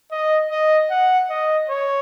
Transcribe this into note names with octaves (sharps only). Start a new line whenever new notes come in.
D#5
D#5
F#5
D#5
C#5